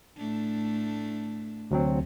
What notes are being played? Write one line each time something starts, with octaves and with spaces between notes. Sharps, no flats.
A2 A3 D4
D2 C3 F#3 C4